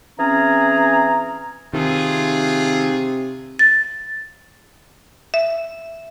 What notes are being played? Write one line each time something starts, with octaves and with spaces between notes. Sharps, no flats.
E3 C4 C#4 G#4 A#5
C3 D#3 A3 F4 G#4
A6
E5